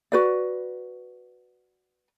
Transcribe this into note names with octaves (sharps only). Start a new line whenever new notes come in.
F#4 B4 D5